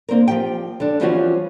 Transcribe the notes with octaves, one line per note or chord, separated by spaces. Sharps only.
A#3 C4 D4 A#4
F3 G4 G5
D3 D4
E3 F3 G3 C4 C#4 F#4